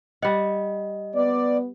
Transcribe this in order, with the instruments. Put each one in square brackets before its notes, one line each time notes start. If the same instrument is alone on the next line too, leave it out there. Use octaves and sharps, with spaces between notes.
[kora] G3 F#5 [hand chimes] D#5
[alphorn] B3 [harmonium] D5